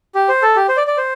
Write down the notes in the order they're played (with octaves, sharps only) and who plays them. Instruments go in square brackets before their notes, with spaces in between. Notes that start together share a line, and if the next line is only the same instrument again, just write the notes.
[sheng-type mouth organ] G4
C5
A4
G4
C5
D5
D5
C5